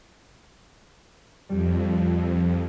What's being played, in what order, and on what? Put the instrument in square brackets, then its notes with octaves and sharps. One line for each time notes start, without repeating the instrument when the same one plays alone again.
[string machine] F2 [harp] G3 G4